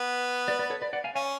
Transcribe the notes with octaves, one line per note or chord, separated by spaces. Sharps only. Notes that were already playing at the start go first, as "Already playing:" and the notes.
Already playing: B3
B4 D5
B4 D5
A4 C#5
B4 D5
D5 F#5
F5 G#5
C#4 F5 G#5